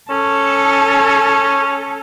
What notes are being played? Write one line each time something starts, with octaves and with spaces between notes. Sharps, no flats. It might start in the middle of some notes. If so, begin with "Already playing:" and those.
C#4 A4